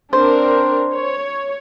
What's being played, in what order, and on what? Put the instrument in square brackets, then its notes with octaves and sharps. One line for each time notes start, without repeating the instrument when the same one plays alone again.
[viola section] C4 D4 A#4 [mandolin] C5
[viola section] C#5